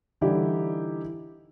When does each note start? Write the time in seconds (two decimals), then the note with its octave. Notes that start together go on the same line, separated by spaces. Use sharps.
0.21 D3 E3 G3 D#4 E4 G4